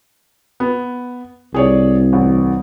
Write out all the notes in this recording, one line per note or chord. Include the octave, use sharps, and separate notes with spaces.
B3
C2 G#4 C#5 D5
A1